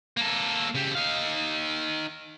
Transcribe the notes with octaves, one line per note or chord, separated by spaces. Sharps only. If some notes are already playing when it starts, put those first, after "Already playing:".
A#3 A4
C#3 G4
D#4 F5